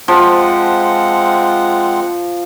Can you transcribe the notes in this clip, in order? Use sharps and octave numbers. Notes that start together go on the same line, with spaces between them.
F3 G#3 C4 F#5